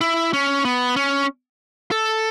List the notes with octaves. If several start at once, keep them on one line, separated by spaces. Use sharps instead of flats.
E4
C#4
B3
C#4
A4